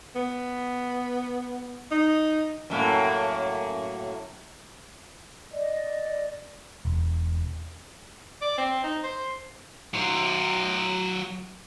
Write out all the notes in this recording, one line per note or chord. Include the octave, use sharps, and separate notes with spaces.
B3
D#4
F#2 A2 A#3
D5 D#5
E1
D5
C4
D#4
C5
F#3 C5